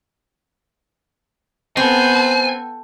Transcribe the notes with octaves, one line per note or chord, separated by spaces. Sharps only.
B3 C4 A4 C5 G#5